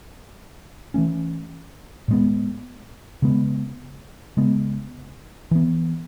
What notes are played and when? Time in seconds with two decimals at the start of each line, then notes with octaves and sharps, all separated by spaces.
0.94 E3 A3 C#4
2.08 A2 G#3 B3
3.22 C#3 G#3 B3
4.37 C#3 G#3 B3
5.51 E3 B3